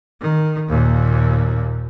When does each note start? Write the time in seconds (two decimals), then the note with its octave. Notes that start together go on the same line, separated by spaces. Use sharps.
0.21 D#3
0.68 D#2 A#2